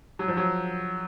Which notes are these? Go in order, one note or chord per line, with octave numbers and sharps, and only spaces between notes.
F#3
F3
F#3